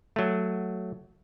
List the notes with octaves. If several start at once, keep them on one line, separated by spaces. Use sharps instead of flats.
F#3 A3